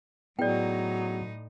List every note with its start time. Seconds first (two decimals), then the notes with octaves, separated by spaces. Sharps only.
0.39 A2 F#3 B3 D#4 E4 G#4 D5 G5